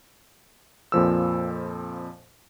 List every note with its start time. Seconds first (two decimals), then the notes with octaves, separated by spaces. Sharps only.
0.92 F2 A#2 F3 E6